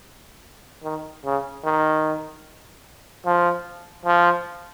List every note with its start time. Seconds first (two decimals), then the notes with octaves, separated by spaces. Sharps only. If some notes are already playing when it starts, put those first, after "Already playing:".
0.84 D#3
1.25 C#3
1.65 D#3
3.26 F3
4.06 F3